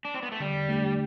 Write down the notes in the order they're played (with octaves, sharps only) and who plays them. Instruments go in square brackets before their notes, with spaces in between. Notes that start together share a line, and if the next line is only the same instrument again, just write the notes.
[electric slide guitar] D4
C4
B3
A3
[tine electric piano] D3 [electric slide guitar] G3
[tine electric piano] A3 D4 G4